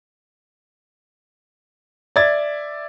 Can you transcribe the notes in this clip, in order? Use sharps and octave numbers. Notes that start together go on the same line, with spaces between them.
D5 E5 G#6 A6